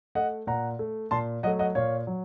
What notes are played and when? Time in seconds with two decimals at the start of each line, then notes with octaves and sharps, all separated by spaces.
0.15 A3 D#5 F#5
0.47 A#2 F#5 A#5
0.79 A3
1.11 A#2 A5 C6
1.43 F#3 D#5 F#5
1.47 A3
1.59 D#5 F#5
1.75 A#2 C#5 F5
2.07 F#3